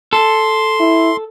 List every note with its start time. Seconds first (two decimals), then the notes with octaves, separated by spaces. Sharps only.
0.13 A4 C6
0.80 E4